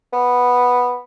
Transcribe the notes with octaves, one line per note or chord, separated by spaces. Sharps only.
B3